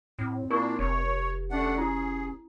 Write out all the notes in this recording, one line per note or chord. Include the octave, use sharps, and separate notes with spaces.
A2 C4
A#2 A#3 D4 E4 A#4 C#6
F1 C#5
A3 C#4 D4 F#5
E4 G#4